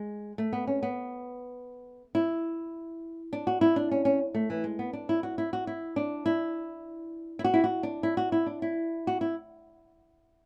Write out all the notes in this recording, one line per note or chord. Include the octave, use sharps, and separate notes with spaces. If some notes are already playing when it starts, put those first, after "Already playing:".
Already playing: G#3
A3
B3
C#4
B3
E4
D4
F#4
E4
D4
C#4
C#4
A3
E3
G#3
B3
D4
E4
F#4
E4
F#4
E4
D4
E4
E4
F#4
E4
F#4
D4
E4
F#4
E4
D4
E4
F#4
E4